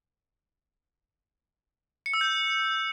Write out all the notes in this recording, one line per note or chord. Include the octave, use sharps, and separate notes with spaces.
C#7
E6
G6